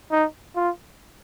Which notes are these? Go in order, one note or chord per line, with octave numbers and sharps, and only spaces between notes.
D#4
F4